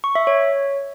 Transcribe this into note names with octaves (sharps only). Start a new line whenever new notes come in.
C#6
E5
C#5